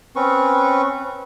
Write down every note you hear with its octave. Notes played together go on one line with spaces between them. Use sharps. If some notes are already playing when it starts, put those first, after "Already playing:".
C4 C#4 B4 C#6